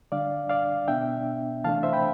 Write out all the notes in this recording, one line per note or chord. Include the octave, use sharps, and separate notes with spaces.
D3 G3 D4 D5 F5
D5 F5
B2 B3 D4 E5 G5
C3 E3 A3 D4 F5 A5
C5 E5
G5 B5